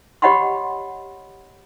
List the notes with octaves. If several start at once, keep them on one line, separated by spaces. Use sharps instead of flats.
G4 C#5 D#5 F#5 B5 C6